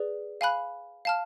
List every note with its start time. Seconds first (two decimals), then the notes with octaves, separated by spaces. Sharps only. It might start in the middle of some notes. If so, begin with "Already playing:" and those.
Already playing: G#4 B4 D5
0.41 F5 G#5 B5 F#6
1.05 F5 A5 F6